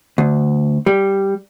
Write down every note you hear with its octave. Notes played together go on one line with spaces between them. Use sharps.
D2
G3